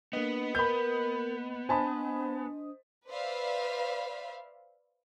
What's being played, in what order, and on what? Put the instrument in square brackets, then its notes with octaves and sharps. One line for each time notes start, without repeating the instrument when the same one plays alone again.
[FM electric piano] A#3 D#5 [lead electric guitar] B3 [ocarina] D4
[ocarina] A#4 [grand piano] B5 G6
[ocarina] D4 [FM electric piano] C5 D#5 D#6 [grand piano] G#5 A5 B5
[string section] B4 C5 D5 E5 F5 B5